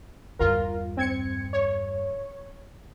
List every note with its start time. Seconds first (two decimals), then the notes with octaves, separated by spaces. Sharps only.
0.39 E2 G2 F4 A#4
0.97 C4 G#6 C#7
1.53 C#5